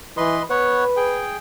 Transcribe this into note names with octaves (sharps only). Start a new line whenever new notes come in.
E3 B4 D#5 C6
B3 B4 C#5 F#5
G#4 G5